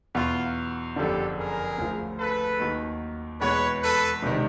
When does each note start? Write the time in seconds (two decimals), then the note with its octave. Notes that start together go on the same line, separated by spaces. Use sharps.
0.15 E2 B2 F#3 F4
0.96 F#1 F2 D3 G4 A4
1.37 G#4 A#4
1.78 D2 C#3 F3
2.19 A4 B4
2.59 D#2 D#3 F#3
3.40 E2 B2 G#3 B3 B4 C#5
3.82 A4 B4
4.22 E1 C3 D#3